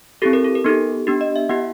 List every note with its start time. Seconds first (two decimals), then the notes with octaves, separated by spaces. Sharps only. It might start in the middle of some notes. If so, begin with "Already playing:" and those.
0.22 C4 E4 G4 A4
0.33 A#4
0.44 A4
0.55 A#4
0.64 B3 D#4 G4 A4
1.07 B3 D4 G4
1.21 D#5
1.36 E5
1.49 B3 E4 G4 F#5